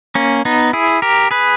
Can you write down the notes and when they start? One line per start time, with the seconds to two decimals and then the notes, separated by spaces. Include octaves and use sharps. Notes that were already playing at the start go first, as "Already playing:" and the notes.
0.15 A#3 C#4
0.45 B3 D#4
0.73 E4 G#4
1.02 G4 A#4
1.31 G#4 B4